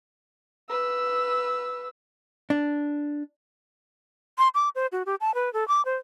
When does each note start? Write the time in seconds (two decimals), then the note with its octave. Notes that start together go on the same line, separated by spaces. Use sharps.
0.70 B4 E6
2.50 D4
4.38 C6
4.55 D6
4.75 C5
4.92 F#4
5.06 G4
5.21 A5
5.35 B4
5.53 A4
5.68 D6
5.85 C5